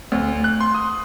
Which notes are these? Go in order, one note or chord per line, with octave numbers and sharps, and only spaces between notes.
D2
F#6
C6
D#6